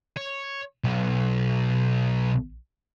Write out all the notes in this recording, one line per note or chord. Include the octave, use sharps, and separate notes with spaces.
C#5
B1